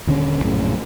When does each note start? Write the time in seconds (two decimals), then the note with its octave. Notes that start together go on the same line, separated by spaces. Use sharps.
0.07 D#1 D3 C#4
0.44 A#1 F#2 A2 C#3